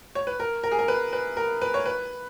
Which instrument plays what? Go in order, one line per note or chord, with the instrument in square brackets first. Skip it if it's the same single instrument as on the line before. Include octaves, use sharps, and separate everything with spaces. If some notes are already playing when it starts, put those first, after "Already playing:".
[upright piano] C#5
B4
A#4
A#4
G#4
A#4
B4
B4
A#4
B4
C#5
B4